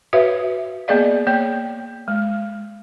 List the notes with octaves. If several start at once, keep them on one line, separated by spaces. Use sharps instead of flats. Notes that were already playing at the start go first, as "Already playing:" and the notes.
F#4 B4 C#5 E5 F5
A#3 B3 G#4 D5 D#5 F5
A#3 C#5 G5
G#3